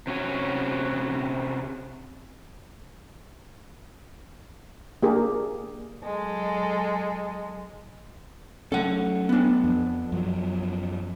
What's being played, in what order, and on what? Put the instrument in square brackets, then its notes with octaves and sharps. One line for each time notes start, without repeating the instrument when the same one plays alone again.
[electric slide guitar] C3 C#4 F#4 C#5
[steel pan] A#3 D4 G4 G#4 A#4
[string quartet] F#3 G#3 A4
[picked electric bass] F#3 A3 C#4 [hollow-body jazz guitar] A4 F#5
[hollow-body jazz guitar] B3 D4
[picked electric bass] F2
F#2 F3 F#3